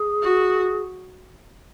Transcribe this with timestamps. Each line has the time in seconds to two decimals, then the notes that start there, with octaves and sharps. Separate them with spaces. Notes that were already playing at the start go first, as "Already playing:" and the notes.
Already playing: G#4
0.22 F#4